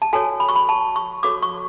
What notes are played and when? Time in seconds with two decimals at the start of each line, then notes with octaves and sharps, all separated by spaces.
0.02 A5
0.13 F#4 A4 C#5 G#5
0.40 B5
0.49 C#6
0.56 B5
0.69 A5
0.96 C#6
1.23 F#4 A4 C#5 D6
1.42 C#6